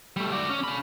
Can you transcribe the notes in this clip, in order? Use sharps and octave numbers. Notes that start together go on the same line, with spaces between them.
G3 A3
F#4 D5
C#4
C#4 B5